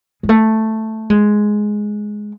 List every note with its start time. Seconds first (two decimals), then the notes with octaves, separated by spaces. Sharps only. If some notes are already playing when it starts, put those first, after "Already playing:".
0.23 G#3
0.29 A3
1.10 G#3